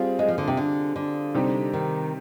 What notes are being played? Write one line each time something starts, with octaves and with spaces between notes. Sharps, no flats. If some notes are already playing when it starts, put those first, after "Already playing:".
Already playing: G3 C4 F4 G#4
G#3
F3
D3
C3
D3
D3
C3 G3 C4 D#4 G4
D#3